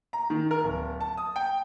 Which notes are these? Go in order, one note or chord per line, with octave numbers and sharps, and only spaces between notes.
A#5
D#3
A#4
D1
A5
D#6
G5